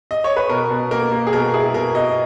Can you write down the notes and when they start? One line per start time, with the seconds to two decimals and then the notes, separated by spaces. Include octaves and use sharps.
0.11 D#5
0.24 C#5
0.36 B4
0.50 B2 A#4
0.70 B2
0.91 A#3 A#4
1.12 A#3
1.27 G#4
1.33 B2 A#4
1.54 E4 G#4
1.74 B2 A#4
1.95 B2 D#5